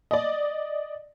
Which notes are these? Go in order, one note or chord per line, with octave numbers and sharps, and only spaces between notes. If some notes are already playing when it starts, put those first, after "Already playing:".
D5 D#5